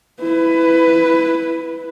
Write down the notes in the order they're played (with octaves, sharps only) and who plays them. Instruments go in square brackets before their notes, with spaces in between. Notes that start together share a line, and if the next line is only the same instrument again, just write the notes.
[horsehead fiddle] E4 B4